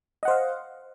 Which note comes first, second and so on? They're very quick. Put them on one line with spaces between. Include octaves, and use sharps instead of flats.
D#5 F#5 C5 F5